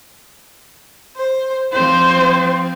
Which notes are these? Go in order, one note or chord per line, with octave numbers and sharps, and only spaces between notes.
C5
F3 C4 C5